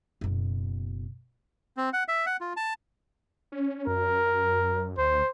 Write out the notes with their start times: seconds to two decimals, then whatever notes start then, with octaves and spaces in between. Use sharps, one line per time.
0.21 F#1 B2
1.77 C4
1.93 F#5
2.08 E5
2.26 F#5
2.41 F4
2.57 A5
3.52 C#4
3.87 F#2 A#4
4.98 D2 C5